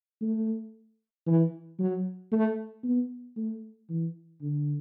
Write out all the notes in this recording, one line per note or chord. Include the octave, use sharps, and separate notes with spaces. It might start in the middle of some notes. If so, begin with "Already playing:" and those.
A3
E3
F#3
A3
B3
A3
E3
D3